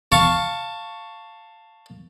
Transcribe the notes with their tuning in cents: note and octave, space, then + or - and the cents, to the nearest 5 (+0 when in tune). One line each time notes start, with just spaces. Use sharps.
F5 +0 A5 +15 C#6 +0